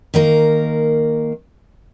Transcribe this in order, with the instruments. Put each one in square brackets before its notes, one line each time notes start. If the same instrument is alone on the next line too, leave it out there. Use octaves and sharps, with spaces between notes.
[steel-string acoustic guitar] D#3 A#3 A#4